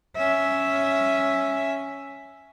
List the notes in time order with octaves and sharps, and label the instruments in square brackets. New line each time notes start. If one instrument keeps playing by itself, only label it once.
[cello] C#4 E5